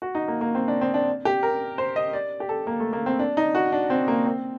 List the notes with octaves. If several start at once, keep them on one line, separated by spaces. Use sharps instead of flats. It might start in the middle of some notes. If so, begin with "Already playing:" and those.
F#4
D#4
A#3
A#3
C4
D4
C4
D4
G4
A#4
C5
D#5
D5
G4
A4
A#3
A3
A#3
C4
D4
D#4
F#4
D4
C4
A#3
C4